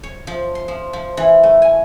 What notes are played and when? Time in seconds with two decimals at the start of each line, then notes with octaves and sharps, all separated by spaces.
0.03 C#5
0.27 F3
0.55 C6
0.68 F3
0.93 F3
1.17 E3
1.43 A3
1.62 G#5